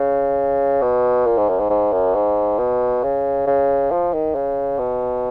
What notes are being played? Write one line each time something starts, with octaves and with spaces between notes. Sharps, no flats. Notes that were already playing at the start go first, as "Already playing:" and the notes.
Already playing: C#3
B2
A#2
G#2
F#2
G#2
G#2
F#2
G#2
B2
C#3
C#3
F3
D#3
C#3
B2